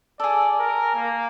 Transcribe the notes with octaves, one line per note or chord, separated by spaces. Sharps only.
G#4 A4 D5
A#4
A#3